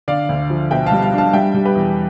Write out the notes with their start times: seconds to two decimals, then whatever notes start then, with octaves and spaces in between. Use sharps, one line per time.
0.08 D3 D5 F5
0.29 D2
0.50 F3
0.71 B2 E5 G5
0.86 F5 A5
0.92 G3
1.02 F5 A5
1.13 D4
1.18 F5 A5
1.33 G3 E5 G5
1.54 G3
1.65 G4 B4
1.76 E2